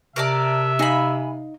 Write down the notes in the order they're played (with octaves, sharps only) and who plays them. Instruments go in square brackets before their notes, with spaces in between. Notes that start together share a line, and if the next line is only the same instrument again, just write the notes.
[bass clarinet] C3 [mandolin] A#4 D5 A5 [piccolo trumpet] E5
[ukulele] D#4 D#5 F5 [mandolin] G#5 B5